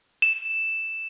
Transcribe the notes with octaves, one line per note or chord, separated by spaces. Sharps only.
E7